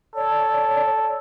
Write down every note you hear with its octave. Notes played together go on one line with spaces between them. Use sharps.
A4 C#5 D5